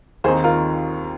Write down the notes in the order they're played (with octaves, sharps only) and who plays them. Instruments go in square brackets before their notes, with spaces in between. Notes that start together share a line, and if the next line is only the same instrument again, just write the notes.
[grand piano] D#2 D#3 C4 D#4 [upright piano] G#4 C5
[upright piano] F4 A#4